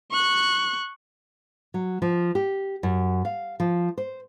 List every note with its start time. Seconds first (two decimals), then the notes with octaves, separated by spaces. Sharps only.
0.12 C#6 F#6
1.74 F#3
2.02 F3
2.35 G4
2.83 F#2
3.25 F5
3.60 F3
3.98 C5